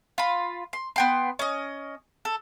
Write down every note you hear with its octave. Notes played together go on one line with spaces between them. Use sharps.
F4 B5
C6
B3 G5 C6
C#4 D#5
A4